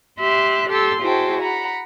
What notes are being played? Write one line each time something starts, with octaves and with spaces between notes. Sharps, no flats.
G4 E5 C6 F#6
G4 A4 C6 E6
E4 F#4 G#4 C5 G5 A5
F#5 A#5 B5